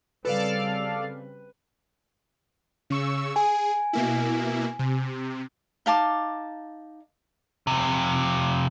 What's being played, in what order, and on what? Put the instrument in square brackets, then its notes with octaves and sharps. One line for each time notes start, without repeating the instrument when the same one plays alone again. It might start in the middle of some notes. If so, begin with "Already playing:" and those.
[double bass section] C#3 G3 C4 [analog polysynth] A4 D5 F5 [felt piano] B4
[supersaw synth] C#3 C#6 E6
[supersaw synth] G#4 [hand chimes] G#5
[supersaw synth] B2 A#3 E4
C3
[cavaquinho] D#4 F5 A5 D6
[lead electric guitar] F2 C3